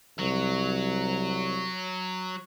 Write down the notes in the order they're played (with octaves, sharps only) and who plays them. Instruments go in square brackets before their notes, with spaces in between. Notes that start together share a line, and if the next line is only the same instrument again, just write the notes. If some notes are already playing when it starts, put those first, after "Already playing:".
[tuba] C2 [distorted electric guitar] F#3